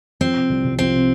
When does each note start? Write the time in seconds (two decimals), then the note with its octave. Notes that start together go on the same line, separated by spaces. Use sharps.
0.21 F3 C4
0.36 C3
0.50 C2
0.65 C2
0.79 F3 C4
0.94 C3